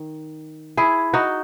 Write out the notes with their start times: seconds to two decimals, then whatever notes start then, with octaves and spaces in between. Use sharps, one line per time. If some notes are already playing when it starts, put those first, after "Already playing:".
Already playing: D#3
0.77 E4 G#4
1.13 D#4 F#4